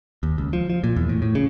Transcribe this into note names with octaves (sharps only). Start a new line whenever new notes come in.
D#2
C#2
F3
F3
A#2
E2
A2
A2
C#3